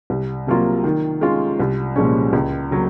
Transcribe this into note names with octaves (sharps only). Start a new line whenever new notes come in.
C2
C3 F#3 A#3 F4
D#3
G#3 C#4 F4
C2
A#2 F3 G#3 C#4
C#2
C#3 F#3 A#3